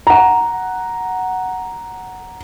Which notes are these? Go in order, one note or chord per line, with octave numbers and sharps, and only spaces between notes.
F#5 A#5